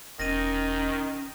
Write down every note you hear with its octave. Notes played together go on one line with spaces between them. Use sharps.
E1 D#3 C#4 A#6 D#7